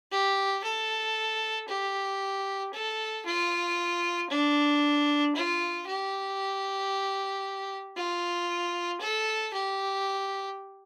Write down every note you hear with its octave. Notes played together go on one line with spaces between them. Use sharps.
G4
A4
G4
A4
F4
D4
F4
G4
F4
A4
G4